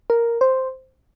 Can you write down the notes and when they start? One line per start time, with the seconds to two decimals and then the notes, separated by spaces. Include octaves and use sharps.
0.10 A#4
0.41 C5